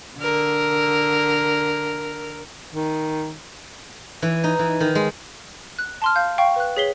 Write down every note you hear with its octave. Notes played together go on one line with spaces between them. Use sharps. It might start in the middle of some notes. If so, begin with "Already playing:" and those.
D3 A#4
D#3
E3
D#4
E3
D#3
G#3
F#6
A5 C6 F6
F5 G6
F5 G5 C#6
B4 F#6
G#4 C#5 B6 C7 G7